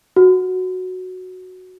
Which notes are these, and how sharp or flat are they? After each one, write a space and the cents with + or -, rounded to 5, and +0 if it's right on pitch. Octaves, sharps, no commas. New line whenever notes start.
F#4 -5